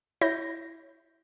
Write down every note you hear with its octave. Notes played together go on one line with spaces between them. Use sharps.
E4 C#5 G6 A#6